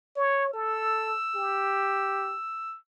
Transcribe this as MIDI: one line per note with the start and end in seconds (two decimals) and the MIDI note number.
0.17 0.51 73
0.54 1.15 69
0.54 2.78 88
1.36 2.36 67